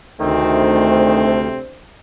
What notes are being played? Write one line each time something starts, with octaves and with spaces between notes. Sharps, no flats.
D2 C3 D#3 A3 C4 D4 C5